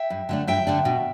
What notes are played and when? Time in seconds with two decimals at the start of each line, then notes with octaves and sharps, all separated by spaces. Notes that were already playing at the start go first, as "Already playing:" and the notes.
Already playing: E5 G5
0.10 G2
0.29 D3 A3 D4
0.47 G2 E5 G5
0.67 D3 A3 D4
0.85 B2